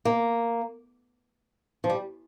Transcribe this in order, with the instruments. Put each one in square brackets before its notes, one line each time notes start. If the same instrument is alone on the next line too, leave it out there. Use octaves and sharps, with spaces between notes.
[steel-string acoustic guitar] A#3
F3
G3